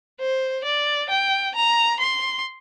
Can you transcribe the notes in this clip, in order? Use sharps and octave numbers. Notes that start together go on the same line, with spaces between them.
C5
D5
G5
A#5
C6